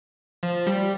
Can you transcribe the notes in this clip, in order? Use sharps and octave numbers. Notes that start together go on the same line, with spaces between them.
F3
G3